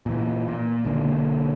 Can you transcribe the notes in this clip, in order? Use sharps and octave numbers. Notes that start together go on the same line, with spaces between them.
A#2 E3
A#2
B1 D3 G3 A#3